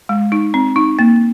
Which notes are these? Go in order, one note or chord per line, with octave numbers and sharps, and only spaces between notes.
G#3
D#4
C4
D#4
A#3